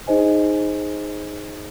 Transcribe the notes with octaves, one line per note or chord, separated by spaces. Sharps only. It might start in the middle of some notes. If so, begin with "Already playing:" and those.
D#4 G#4 C5 D#5 G#5